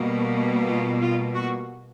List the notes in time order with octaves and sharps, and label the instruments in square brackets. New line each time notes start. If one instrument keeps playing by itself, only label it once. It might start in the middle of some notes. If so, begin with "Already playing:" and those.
Already playing: [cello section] B2 G3 A#3
F4
F4
F#4